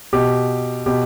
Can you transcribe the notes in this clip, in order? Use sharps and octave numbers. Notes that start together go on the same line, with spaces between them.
B2 G4
B2 G4